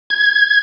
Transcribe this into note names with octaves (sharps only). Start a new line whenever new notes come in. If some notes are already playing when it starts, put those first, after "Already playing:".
G#6